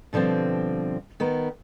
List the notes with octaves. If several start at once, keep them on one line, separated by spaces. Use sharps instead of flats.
B2 D3 F3 G3 C4
D#3 B3 A#4